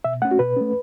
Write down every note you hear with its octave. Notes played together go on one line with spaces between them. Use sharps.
B2 E5
A3 C#4 F#5
F#4
B2 B4
A3 C#4